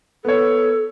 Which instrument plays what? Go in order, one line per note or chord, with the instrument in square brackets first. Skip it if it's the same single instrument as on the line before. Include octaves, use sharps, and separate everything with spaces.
[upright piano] B3 C#5 [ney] A4